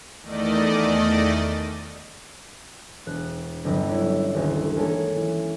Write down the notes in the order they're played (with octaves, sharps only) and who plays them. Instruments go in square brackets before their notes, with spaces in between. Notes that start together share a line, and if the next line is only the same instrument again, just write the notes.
[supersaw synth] E2 D#3 A3 D5 D#5
[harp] E1 F#6
G1 D2 C3 F#3 G3
C#4 E4
D#1 D2
E3 G#3 A#3 C#4 G#4 A4
E3